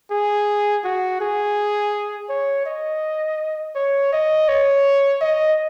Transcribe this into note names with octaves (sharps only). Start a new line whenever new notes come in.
G#4
F#4
G#4
C#5
D#5
C#5
D#5
C#5
D#5